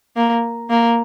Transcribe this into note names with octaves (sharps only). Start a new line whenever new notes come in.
A#3
A#3